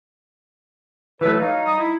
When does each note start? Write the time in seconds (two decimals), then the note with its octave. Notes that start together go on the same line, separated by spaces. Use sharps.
1.21 E3 F#3 A3 B4
1.39 D#4 F#4 C#5 F5
1.66 G3 A#5 D#6
1.79 E4